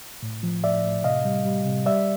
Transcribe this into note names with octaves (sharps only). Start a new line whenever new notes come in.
A2
F3
A2 D5 E5
A2
C3 D#5 F5
G3
G3
C3
G3 D5 E5